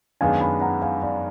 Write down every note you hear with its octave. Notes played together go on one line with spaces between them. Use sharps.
F#2 D#3 G#3 B3 D4 F5 G#5
G#5 B5
F#5 A#5
F5 G#5
D5 F5